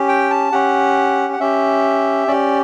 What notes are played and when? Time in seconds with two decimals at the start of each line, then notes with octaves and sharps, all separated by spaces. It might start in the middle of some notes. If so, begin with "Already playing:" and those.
Already playing: C#4 G4
0.09 G5
0.30 A5
0.52 C#4 G4 F#5
1.33 F#5
1.40 C#4 G4 E5
2.28 C#4 G4 D5